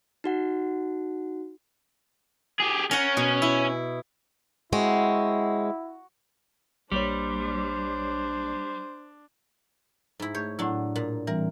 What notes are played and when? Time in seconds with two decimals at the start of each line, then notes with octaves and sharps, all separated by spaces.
0.24 D#4 F#4 F#5
2.60 G4 G#4
2.91 C#4 A#4 F#5
3.17 B2
3.42 E4
4.72 G#3 C4 E4 F#4
6.92 A#1 G3 A#3 D4 C5 C#5
10.20 G#2 E4
10.35 A3 G#4 C#5 G6
10.59 A2 F#3 D4 E4
10.96 A#2
11.27 E3 G3 C4 A#4